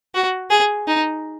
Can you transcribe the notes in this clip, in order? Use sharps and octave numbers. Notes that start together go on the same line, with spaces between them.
F#4
G#4
D#4